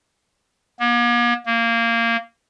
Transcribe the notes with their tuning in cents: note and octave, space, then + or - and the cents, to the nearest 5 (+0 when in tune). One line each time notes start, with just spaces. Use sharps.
A#3 +45
A#3 -15